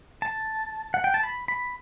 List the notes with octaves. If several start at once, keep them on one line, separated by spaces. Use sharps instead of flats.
A5
F#5
G5
A5
B5
B5